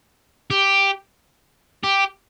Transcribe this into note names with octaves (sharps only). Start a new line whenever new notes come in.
G4
G4